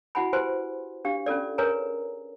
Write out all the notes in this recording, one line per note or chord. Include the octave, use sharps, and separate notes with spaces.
E4 F#4 F#5 G#5 B5
E4 G4 B4 C5 G#5 C6
D4 G4 F5
C#4 F4 A4 D5
G#4 A#4 B4 C#5 G#5 A#5